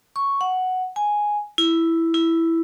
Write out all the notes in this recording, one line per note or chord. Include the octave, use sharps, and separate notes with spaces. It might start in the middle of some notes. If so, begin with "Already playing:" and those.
C#6
F#5
G#5
E4
E4